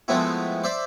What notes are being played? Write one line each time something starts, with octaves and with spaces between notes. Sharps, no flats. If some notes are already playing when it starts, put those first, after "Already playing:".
F3 G#3 A3 B3 C4 E4
C5 D5 E5